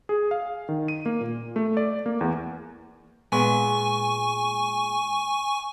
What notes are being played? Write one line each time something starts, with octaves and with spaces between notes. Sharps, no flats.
G#4
F5
D#3
D#7
A#3
A#2
A3
D5
A#3
E2
A#2 G#3 B3 G#5 C#6